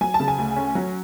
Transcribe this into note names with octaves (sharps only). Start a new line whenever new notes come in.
F#3 G#5
A5
C#3
G#5
D2
C#4
F#3